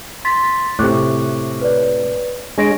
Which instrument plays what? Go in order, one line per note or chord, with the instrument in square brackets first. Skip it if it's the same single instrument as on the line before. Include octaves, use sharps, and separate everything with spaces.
[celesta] C6 A6 B6
[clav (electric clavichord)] A2 C3 [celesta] C#6 D6 F#6
[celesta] B4 C#5 D5
[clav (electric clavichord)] G#3 C#5 [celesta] D4 A#6 D7